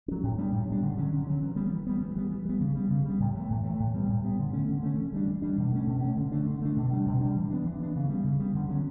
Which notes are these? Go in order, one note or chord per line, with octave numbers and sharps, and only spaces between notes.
F#3 C#4
A2
G3 B3 D4
A2
G3 B3 D4
D3
F#3 C#4
D3
F#3 C#4
E3
G3 B3
E3
G3 B3
E3
G3 B3
E3
G3 B3
C#3
G3 B3
C#3
G3 B3
A2
E3 A3
A2
E3 A3
A2
G3 B3
A2
G3 B3
D3
A3 C#4
D3
A3 C#4
E3
G3 D4
E3
G3 D4
B2
A3 C#4
B2
A3 C#4
D3
A3 D4
D3
A3 D4
B2
G3 D4
B2
G3 D4
E3
B3 D4
E3
B3 D4
C#3
G3 B3
C#3
G3 B3
D3
F#3 C#4